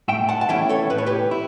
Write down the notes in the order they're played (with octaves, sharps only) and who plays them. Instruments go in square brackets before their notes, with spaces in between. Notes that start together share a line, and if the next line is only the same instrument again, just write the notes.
[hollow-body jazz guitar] A2 E5 G5
F#5 A5
A5
E3 A3 C#4 E4 E5 G5
A4 C#5
A2 B4
C#5
G4 B4
E4